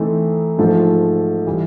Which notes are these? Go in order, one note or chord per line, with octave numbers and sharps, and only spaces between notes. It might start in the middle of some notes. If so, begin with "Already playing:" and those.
Already playing: E3 A3 C4 D#4
G#2 F3 A3
E3 G3